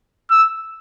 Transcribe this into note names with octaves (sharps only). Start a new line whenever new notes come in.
E6